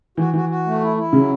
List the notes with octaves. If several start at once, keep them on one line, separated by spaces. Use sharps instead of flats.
E3 F#4
E3 F#4
F#4
A3
E4
E4
C#3 F#3